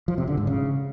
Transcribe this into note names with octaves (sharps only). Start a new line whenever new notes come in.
F3
C3
D3
G#2
C#3